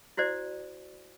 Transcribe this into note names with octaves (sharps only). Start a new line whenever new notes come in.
E4 F#4 C5 D5